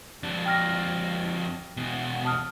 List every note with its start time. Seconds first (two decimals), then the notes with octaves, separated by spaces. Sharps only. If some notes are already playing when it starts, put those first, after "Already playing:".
0.23 F2 D4
0.46 G5 F6 A#6
1.77 E2 B2
2.25 A5 D#6 F6